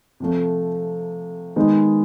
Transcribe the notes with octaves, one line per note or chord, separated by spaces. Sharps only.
C3 F3 A3
D#3 G#3 B3 D#4